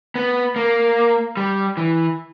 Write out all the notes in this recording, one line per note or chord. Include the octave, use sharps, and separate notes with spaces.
B3
A#3
G3
E3